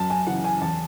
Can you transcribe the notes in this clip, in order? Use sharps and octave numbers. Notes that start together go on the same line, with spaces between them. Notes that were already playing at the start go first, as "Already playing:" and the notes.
Already playing: F#2 A5
G#5
C#3 E3 F#5
G#5
E2 A5